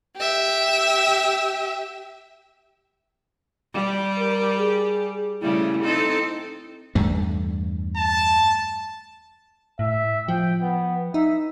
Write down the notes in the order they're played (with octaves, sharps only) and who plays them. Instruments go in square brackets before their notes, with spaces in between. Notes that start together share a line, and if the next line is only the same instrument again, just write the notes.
[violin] G4 E5
[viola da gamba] G3 G4
[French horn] A#4
G#4
[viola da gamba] C#3 G3 A3 [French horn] E4
[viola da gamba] C4 D#4 A4 [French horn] E4
[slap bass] E2 G2 A3
[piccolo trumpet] A5
[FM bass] A2 [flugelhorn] E5
[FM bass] F3 [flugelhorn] G5
[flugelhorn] B3
[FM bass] D#4 [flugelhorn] E5